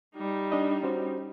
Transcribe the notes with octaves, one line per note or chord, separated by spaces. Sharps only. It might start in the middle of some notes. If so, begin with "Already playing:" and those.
G3 D#4
D4 D#5
C#4 F#4 C5